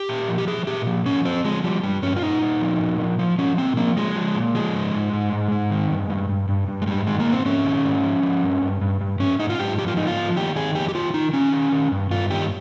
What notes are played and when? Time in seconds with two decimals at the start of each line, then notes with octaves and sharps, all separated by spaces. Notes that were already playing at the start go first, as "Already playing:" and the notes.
Already playing: G4
0.09 A#2
0.28 F3
0.38 G4
0.47 F3 G#4
0.67 A#2 G4
0.86 F3
1.06 F3 C#4
1.25 F3 C4
1.45 F3 G#3
1.64 F3 G3
1.83 G2 G3
2.03 G2 C#4
2.16 F4
2.22 A#2 D#4
2.42 A#2
2.61 F3
2.80 A#2
3.00 F3
3.19 F3
3.38 F3 C#4
3.58 A#2 C4
3.77 F3 A#3
3.97 F3 G#3
4.16 F3
4.35 A#2
4.55 F3 G#3
4.74 G#2
4.94 G#2
5.13 G#2
5.32 G#2
5.51 G#2
5.71 D#3
5.91 G2
6.10 G2
6.29 G2
6.49 G2
6.68 G2
6.82 G#3
6.87 G#2 G3
7.07 D#3 G#3
7.20 A#3
7.26 G#2
7.33 C4
7.45 G#2 C#4
7.65 D#3
7.84 G#2
8.04 F3
8.23 F3
8.42 G2
8.62 G2
8.81 G2
9.01 G2
9.20 G#2 C#4
9.39 G#2 D#4
9.50 F4
9.59 G#2 G4
9.78 F3 G4
9.88 F4
9.97 G#2 D#4
10.07 F4
10.17 F3
10.36 D#3 G4
10.56 D#3 G#4
10.75 F2 G4
10.89 G4
10.95 D#3 F4
11.14 D#3 D#4
11.33 D#3 C#4
11.53 D#3
11.72 D#3
11.92 G2
12.10 G2 F4
12.30 D#3 G4